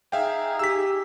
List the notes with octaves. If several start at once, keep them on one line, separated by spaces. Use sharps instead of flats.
D#4 G#4 E5 F5 G5
G4 E6 B6